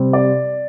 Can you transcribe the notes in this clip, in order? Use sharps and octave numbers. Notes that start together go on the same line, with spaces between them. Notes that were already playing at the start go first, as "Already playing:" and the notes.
Already playing: C3 G3 C4
D5